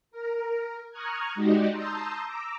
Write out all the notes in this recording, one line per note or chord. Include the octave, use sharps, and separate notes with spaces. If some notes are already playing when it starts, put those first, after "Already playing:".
A#4
A#5 C#6 D#6 F6 F#6 G#6
G#3 D#4 F#4 G4 D5 D#5
A5 A#5 C6 D#6 E6 G6
A#5 D6 E6